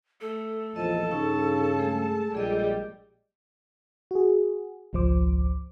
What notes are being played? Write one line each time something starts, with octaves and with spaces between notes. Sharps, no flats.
A3 A4
A#1 E2 F3 D#5 A5
G2 C#3 D#4 C#6
G#3 A3 G#4
A#1 G3 G#3 G#4 D#5
F#4 G#4
G#1 C#2 F3 C5 D6